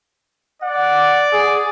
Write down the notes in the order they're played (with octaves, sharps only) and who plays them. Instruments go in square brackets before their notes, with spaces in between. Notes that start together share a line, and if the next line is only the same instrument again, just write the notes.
[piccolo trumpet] D5 [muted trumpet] F#5
[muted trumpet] G#4